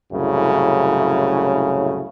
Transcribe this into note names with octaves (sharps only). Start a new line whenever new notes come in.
C2 F#2 A2 C#3